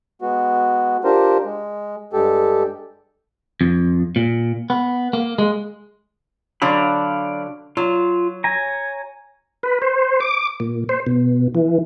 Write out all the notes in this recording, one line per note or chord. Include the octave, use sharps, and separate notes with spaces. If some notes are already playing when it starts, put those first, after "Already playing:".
G#3 B3 F#4
D4 F4 G4 A#4 C5
G#3
G2 G#3 G4 A4
F2
A#2
B3
A#3
G#3
D3 F#3 D5 F5 B5
F#3 F4
C#5 G#5 A#5
B4
C5
D6
A#2
C5
B2
E3